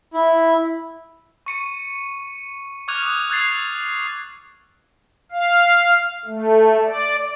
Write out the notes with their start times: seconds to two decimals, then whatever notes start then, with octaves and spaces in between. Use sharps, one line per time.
0.13 E4
1.46 C#6 C#7 D#7
2.88 C#6 D6 F6 F#6 G#6 F7
3.02 D#6 F#6
3.30 E6 F#6 G#6 A6 C7
5.32 F5
6.25 A3
6.86 D5